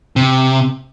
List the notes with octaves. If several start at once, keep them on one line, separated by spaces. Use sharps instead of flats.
C3